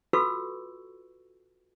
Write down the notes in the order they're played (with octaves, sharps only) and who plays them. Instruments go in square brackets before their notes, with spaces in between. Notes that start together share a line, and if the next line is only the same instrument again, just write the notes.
[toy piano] F4 F#4 A4 B4 C#6 E6